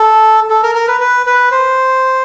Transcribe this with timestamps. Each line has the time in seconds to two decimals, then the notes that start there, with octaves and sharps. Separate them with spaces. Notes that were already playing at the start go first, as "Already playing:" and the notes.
Already playing: A4
0.50 A4
0.63 A#4
0.75 A#4
0.88 B4
1.00 B4
1.26 B4
1.52 C5